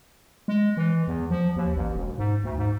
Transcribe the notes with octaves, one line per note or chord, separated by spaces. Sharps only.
G#3
E3
E2
F3
D#2
A1
E1
G#2
D2
G#2